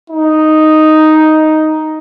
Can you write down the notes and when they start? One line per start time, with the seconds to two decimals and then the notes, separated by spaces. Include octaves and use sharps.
0.10 D#4